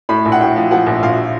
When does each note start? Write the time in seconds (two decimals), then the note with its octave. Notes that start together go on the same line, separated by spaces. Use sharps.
0.09 A2 B5
0.25 A#1
0.32 F#5
0.40 A2 G5
0.56 F3
0.71 F3 F#5
0.86 A#1
1.03 A#1 F5